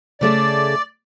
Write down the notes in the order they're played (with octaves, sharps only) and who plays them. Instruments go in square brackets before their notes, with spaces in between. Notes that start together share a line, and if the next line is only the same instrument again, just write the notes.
[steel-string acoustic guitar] C#3 A3 G#4 [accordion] D5